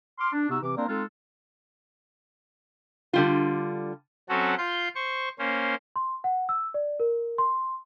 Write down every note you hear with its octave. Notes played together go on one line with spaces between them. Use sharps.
C6 D6 F6
D4
C3 B3 D#4 F#4 E6
C3 E3 C4 D6
A#3 C4 D4 A#4 C5 D5
G#3 C4 D#4 F4 A4
D3 G3 F4
F#3 C4 C#4 F#4 A4
F4 C6 G6
C5 C#6
A#3 C#4 C5
C6
F#5
E6
D5
A#4
C6